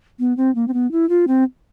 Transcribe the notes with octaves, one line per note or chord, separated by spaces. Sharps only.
B3
C4
A#3
C4
B3
E4
F4
C4